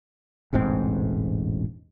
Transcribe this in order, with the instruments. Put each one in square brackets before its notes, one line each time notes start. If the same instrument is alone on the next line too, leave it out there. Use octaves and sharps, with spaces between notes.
[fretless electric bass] E1 A1 G#2 C4